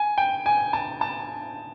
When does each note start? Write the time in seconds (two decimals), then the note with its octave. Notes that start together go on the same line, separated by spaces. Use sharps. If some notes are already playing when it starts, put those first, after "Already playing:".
Already playing: G#5
0.18 G5
0.46 G#5
0.73 A5
1.01 A5